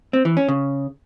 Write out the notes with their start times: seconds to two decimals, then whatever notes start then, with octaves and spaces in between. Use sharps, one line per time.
0.13 C4
0.25 E3
0.37 C#4
0.48 C#3